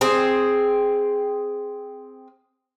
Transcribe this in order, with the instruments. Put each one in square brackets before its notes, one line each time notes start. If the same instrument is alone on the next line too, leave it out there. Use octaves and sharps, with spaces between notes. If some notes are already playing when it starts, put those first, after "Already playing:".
[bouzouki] C4 G#4